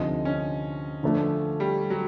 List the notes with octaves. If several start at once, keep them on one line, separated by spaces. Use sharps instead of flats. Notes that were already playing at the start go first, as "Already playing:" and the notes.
Already playing: D2 C3 F3 D#4
C#4
D3 F3 A3 D4
G3
F#3